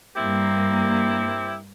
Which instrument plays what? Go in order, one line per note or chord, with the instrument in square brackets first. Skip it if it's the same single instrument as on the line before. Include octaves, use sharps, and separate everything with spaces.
[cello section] G2 A#3 [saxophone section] C4 E4 G4